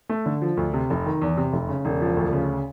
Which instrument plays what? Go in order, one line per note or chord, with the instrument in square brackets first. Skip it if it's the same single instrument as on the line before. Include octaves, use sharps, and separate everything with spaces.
[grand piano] A3
D3
F3
D2
C3
F1
D#3
E2
C3
F1
C#3
E1
F3
D2
C#3